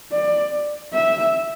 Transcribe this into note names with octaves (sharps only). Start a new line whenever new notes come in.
D5
E5